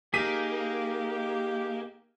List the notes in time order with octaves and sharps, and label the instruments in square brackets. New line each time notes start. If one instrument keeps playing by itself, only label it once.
[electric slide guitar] A#3 [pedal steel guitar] D#4 G#4 [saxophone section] G4 [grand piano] B6 D#7